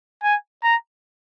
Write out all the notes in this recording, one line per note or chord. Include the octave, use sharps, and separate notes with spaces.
G#5
A#5